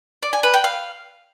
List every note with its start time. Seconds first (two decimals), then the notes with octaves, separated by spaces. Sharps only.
0.23 D5
0.33 G#5
0.43 B4
0.54 G5
0.64 F5